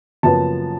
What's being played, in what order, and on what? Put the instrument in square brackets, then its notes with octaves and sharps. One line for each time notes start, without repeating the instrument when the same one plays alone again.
[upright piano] F#1 F#2 F3 B3 A5